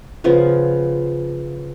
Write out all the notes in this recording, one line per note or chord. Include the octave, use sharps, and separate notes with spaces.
C#3 F3 B3